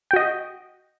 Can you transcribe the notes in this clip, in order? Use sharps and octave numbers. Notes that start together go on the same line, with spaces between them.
F#4 D#5 G5